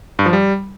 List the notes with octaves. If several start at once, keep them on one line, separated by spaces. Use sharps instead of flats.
G2
F3
G3